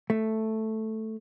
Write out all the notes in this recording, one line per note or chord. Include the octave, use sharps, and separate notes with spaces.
A3